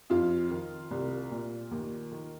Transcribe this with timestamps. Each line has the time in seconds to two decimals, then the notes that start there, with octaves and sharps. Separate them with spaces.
0.10 F2 F4
0.50 D#3
0.91 C2
1.30 A#2
1.71 D#2
2.12 D#3